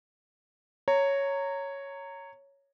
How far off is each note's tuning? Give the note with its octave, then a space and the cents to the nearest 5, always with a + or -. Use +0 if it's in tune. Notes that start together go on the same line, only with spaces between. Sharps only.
C#5 +0 A#5 -20